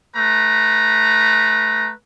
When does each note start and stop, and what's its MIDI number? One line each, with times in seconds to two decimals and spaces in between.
0.15 1.91 57
0.15 1.91 71
0.15 1.91 82